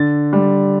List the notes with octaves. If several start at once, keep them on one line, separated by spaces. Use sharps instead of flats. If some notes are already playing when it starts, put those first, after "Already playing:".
Already playing: D3 A6
G3